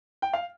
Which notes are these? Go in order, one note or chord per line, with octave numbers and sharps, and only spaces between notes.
G5
F5